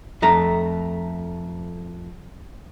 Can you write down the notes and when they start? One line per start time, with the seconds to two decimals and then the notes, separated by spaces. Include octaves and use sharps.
0.22 F2 A3 A#5